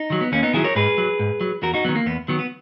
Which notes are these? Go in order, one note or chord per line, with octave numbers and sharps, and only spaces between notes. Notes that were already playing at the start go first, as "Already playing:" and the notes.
Already playing: D#4
D#3 F#3
B3
D#2 A#3 C#4
B3 D#4
D#3 F#3 E4 G#4
A#4 C#5
G#2 G#4 B4
F#3
G#2
F#3
E2 F#4 A#4
D#4 F#4
D#3 F#3 B3
A#3
E2 B3
D#3 F#3 B3
B3